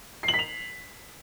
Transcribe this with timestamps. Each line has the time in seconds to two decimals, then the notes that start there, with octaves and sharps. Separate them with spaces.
0.23 C7
0.28 F#7
0.34 B6
0.39 F7